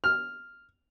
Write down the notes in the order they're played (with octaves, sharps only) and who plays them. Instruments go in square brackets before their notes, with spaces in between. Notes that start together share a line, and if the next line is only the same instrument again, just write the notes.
[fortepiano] F6